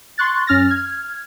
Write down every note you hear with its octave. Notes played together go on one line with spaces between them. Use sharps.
C6 C#6 F#6 A6
F#2 C#4 F6 A6 A#6
F6 G#6